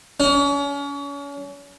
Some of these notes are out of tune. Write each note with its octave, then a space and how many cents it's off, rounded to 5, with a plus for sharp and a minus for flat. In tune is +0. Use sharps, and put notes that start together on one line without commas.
C#4 +35